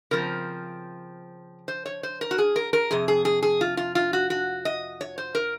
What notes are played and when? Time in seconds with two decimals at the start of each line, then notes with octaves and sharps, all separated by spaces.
0.11 C#3 F3 C4 A#4
1.68 C5
1.86 C#5
2.03 C5
2.21 A#4
2.31 F#4
2.38 G#4
2.56 A#4
2.73 A#4
2.91 F2 C3 G#4
3.08 G#4
3.25 G#4
3.42 G#4
3.61 F4
3.77 F4
3.95 F4
4.13 F#4
4.30 F#4
4.65 D#5
5.01 C#5
5.18 C5
5.35 A#4